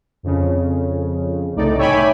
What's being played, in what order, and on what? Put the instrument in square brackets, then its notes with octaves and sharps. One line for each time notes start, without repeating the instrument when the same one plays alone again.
[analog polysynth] F2 C#3
C2 A2 D#4 D5
C#5 E5 G5 G#5 B5 D6